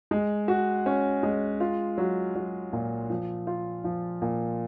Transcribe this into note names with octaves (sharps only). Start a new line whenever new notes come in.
G#3
F#4
C#4
G#3
F4
F#3
F#3
A#2
F3
F4
F3
A#2